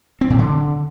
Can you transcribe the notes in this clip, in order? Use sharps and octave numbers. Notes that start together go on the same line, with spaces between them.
C4
A2
D3